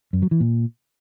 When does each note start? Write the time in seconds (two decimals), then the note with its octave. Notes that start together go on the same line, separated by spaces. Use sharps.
0.13 F#2
0.22 F#3
0.31 E3
0.40 A#2